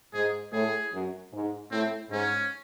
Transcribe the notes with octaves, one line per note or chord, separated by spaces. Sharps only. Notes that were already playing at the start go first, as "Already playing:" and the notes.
G#2 G#4
A2 G#4
F#2
G#2
A2 C4
G#2 C#4